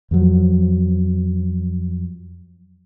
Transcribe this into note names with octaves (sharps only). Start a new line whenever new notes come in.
F2 F3 F#3